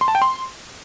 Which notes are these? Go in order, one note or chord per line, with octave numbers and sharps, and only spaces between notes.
C6
A5
G5
C6